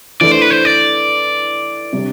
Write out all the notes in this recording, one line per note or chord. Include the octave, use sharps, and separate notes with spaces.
E3 A3 D4 D5
C5
B4
C5
D5
C3 G3 D4